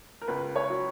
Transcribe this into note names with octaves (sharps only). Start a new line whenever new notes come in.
A#4
C#2 B4
C#5
F#3